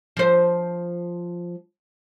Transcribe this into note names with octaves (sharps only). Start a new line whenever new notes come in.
F3 C5